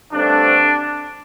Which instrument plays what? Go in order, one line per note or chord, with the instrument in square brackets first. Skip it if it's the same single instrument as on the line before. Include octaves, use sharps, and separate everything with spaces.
[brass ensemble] G2 D3 A3 C4 D4